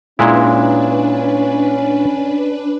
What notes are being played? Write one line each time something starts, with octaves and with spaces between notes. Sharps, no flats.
A#2 G#3 C#4 D4 E4 B4